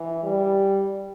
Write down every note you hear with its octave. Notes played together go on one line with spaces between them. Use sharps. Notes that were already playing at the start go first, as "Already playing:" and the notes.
Already playing: E3
G3